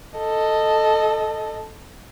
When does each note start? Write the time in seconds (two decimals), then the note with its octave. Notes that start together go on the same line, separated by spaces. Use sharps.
0.19 A4 D#5